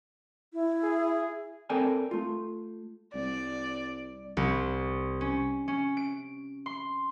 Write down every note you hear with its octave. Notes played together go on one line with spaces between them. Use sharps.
E4
G#4
C4 A4 A#4 D5 G5 G#5
A3 F4
C2 D5
C2
C#4
C#4
D7
C6